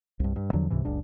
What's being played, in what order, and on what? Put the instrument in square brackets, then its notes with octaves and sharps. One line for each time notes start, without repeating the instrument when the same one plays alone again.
[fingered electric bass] C2 G2
G2
E2 D3 F3 F#3
C#2 G#2 C3 E3
F#1 C#2 C#3 D4